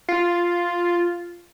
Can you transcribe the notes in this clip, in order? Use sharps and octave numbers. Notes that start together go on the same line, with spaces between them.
F4